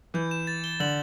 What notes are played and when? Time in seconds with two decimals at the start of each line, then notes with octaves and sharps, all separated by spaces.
0.14 E3 G6
0.31 E7
0.47 A6
0.64 G7
0.80 D3 F#7